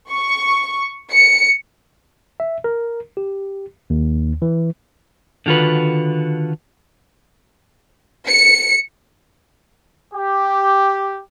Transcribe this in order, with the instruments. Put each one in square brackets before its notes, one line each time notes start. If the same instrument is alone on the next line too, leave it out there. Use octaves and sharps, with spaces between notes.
[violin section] C#6
C#7
[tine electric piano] E5
A#4
G4
D#2
E3
[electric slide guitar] D3 D#3 F4 F#4 B4
[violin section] C#7
[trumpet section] G4